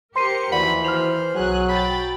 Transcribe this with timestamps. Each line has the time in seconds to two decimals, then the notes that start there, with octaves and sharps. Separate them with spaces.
0.16 G4 A#4 C5 C6 C7 C#7 D#7
0.52 D#2 E3 F3 F#4 D5 F#5 B5
0.84 C5 F6 F7
1.36 B1 F#3 G#4 F#6
1.69 G5 B5 A6